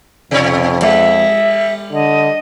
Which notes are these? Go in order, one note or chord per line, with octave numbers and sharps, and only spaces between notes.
F2 B2 C#5
G3 E5
D3 D#5